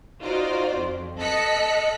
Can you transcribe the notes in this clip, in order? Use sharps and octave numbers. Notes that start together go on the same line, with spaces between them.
D#4 F4 F#4 C5 D5
F2
A4 D#5 F#6 B6 C#7